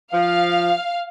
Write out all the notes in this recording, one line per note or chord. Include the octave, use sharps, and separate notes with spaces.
F3 F5